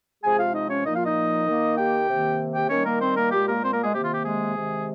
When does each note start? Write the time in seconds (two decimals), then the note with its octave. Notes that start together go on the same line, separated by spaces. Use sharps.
0.23 C3 F3 G#3 G#4 G#5
0.38 F4 F5
0.54 D#4 D#5
0.70 C#4 C#5
0.85 A#2 F3 A#3 D#4 D#5
0.96 F4 F5
1.06 D#4 D#5
1.46 D#3 A#3
1.78 G4 G5
2.08 C3 D#3 A#3
2.55 G4 G5
2.70 D#3 G3 A#3 C#4 C#5
2.85 A#3 A#4
3.01 C4 C5
3.16 A#3 A#4
3.31 A#2 G#3 G4
3.48 A#3 A#4
3.63 C4 C5
3.73 A#3 A#4
3.83 G#3 G#4
3.93 C3 D#3 A#3 G4
4.04 F4
4.14 G4
4.24 G#3 G#4
4.56 C3 D#3 G#3